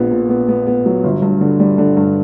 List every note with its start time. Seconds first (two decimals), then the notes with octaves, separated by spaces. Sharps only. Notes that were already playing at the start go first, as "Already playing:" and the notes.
Already playing: A#1 A#2 B3
0.11 A#2
0.29 B3
0.49 B3
0.67 B3
0.86 F#3
1.04 G1
1.22 G2
1.41 D3
1.59 G3
1.78 D3
1.97 G2